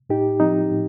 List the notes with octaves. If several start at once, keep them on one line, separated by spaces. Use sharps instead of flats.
A2 D#4 G4
F3 C4 D#4
A2